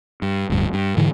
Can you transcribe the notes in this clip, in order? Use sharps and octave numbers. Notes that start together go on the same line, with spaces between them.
G2
D1 D2 G2
G2
G#2 D3 E3